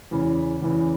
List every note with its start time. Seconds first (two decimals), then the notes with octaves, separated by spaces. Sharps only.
0.11 E2 C#3 E3
0.62 E2 C#3 E3